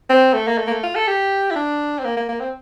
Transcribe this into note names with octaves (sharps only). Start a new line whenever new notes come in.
C4
A3
A#3
A3
A#3
A3
F4
A4
G4
E4
D4
C4
A#3
A#3
A#3
C4